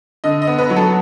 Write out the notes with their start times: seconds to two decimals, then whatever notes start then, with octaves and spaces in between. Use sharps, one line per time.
0.24 D3 D#5
0.42 D#5
0.47 B3
0.58 B4
0.70 F#3
0.77 A4